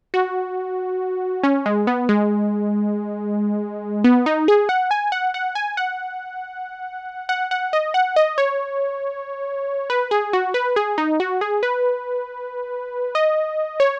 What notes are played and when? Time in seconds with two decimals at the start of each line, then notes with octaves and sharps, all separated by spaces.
0.14 F#4
1.43 C#4
1.66 G#3
1.87 B3
2.09 G#3
4.04 B3
4.26 D#4
4.48 G#4
4.69 F#5
4.91 G#5
5.12 F#5
5.34 F#5
5.55 G#5
5.77 F#5
7.29 F#5
7.51 F#5
7.73 D#5
7.94 F#5
8.16 D#5
8.38 C#5
9.90 B4
10.11 G#4
10.33 F#4
10.54 B4
10.76 G#4
10.98 D#4
11.20 F#4
11.41 G#4
11.63 B4
13.15 D#5
13.80 C#5